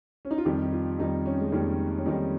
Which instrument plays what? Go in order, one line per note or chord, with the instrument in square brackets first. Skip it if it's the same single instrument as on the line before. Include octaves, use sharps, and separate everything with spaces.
[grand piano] C#4
D#4
F4
F2 D#3 G3 G4
D#4
F4
F2 D#3 G3 D#4
C#4
G#3
F2 D#3 G3 A#3
C#4
F2 D#3 G3 D#4